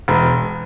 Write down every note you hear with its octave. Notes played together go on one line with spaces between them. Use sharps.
E1